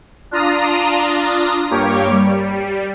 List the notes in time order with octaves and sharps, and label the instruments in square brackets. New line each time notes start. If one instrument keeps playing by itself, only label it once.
[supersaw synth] D4 F4 A#5 D#6
G2 A#3 G4 C#5 D7
G3